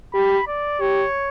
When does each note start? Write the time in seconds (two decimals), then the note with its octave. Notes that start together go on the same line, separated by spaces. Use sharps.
0.14 G4 B5
0.47 D5
0.80 G4 C#5